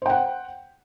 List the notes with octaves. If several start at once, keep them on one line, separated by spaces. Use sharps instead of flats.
C5 F#5 G5